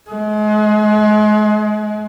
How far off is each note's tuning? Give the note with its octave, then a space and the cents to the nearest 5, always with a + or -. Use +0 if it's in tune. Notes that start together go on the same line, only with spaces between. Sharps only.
G#3 +35